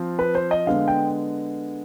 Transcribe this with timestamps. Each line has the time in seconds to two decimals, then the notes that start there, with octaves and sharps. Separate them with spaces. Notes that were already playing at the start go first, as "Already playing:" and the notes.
Already playing: F3 C4 F4
0.19 B4
0.35 C5
0.51 D#5
0.67 D3 G#3 B3 F5
0.88 G5